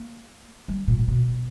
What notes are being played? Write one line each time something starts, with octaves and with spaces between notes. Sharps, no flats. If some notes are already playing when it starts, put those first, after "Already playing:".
Already playing: A#3
G3
A#2
A#2
B2